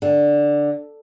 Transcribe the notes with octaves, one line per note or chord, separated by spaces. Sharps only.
D3